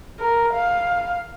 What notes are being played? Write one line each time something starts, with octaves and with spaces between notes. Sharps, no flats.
A#4
F5